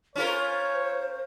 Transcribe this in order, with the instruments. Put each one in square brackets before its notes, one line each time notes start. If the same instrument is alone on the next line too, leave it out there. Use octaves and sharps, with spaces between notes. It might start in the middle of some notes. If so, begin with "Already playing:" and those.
[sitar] C#4 F4 A#4 [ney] C5 [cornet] C#5